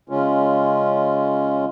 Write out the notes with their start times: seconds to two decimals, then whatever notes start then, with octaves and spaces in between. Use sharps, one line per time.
0.09 C#3 G#3 C#4 F4